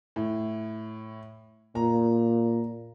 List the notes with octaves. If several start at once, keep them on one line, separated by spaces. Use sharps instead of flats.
A2
A#2 A#5